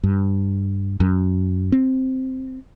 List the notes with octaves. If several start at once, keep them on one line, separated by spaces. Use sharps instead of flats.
G2
F#2
C4